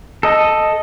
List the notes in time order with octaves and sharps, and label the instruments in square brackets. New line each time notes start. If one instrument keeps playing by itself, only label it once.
[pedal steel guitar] A4 D#5